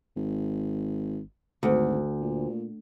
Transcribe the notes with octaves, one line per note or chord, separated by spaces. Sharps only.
G#1
G#1 D2
A#2